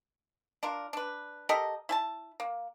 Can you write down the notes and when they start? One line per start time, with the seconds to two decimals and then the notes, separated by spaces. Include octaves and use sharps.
0.63 D4 F4 A#4
0.93 D4 B4
1.49 G4 A4 A#4 D#5
1.89 E4 G#5 A5
2.40 A#3